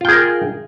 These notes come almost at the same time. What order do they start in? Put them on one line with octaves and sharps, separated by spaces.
F4 G5 G#4 A#4